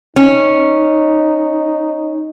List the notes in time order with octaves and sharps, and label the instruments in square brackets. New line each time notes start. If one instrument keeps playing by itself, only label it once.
[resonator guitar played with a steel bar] C#4 [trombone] D#4